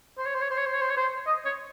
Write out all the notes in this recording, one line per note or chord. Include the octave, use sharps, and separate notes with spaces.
C5
C#5
C5
C#5
C5
C#5
C5
C#5
C5
C#5
C5
D#5
C#5